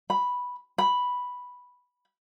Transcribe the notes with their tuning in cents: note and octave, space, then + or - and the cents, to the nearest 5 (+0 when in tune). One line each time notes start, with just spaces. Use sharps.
B5 -5
B5 -5